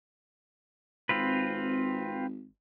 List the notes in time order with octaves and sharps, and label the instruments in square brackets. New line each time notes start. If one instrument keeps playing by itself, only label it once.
[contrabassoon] G#1 [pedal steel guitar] C4 F4 B4